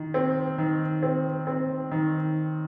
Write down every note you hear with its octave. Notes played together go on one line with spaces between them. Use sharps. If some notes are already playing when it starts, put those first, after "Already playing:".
Already playing: D#3
C4
D#3
C4
C4
D#3